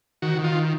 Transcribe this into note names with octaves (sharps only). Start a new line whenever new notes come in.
D#3 F#4
D#3
F4